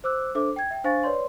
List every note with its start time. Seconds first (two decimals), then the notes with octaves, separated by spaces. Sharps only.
0.04 C5 D6 E6 F#6
0.35 D4 A4 C5 E5 D6
0.56 G5 G#6
0.71 E5 G5
0.84 D4 C5 F5 G#5 C#6 A6
1.03 B4 C#5 D5 C6